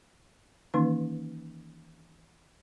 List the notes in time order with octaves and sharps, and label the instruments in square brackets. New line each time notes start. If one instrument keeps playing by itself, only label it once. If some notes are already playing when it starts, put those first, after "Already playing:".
[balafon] D#3 E3 A#3 C#4 D#4 C6